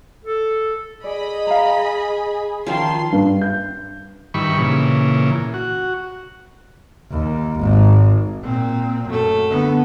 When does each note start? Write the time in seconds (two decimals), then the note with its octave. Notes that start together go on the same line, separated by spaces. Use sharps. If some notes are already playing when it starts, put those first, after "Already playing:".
0.25 A4
1.04 G#4 D5 D#5 B5
1.47 F5 A#5
2.67 D#3 F3 C#4 F4 G5 C6
3.12 G2
3.41 G6
4.34 G2 D#3 E3 B5 C#6
4.59 A#2 C#3 E3
5.54 F#4
7.11 D#2
7.59 G#1
8.43 A#2 C4
9.08 F#2 A3 A4
9.49 D3 B3